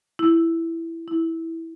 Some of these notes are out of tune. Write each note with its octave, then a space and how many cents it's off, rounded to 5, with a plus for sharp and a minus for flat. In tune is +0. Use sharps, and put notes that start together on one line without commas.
E4 +5
E4 -10